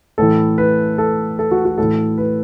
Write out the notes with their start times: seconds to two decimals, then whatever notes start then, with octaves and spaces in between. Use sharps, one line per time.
0.18 A2 E3 A4
0.58 B4
0.98 A4
1.39 A4
1.51 F#4
1.65 F#4
1.78 A2 E3 A4
2.18 B4